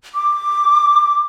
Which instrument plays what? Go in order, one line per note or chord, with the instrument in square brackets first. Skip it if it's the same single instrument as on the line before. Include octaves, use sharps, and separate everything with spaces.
[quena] D6